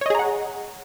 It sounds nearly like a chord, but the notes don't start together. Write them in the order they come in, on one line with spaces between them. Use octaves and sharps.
C#5 D#5 G#4 A#5 F#5